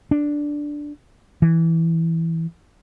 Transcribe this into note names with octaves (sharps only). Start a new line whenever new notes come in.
D4
E3